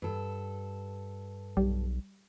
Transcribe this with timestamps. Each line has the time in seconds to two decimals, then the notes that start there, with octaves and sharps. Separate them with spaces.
0.02 G2 A4
1.57 B1 G3